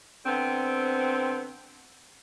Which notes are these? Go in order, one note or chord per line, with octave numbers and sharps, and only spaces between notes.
D3 B3 C4